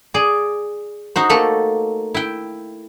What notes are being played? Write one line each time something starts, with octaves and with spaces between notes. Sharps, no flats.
G#4 D5
D#4 F#4 C5
A3 A#3 A4
E4 G5